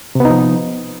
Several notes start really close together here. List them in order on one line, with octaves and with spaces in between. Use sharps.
C3 B3 D#4 F3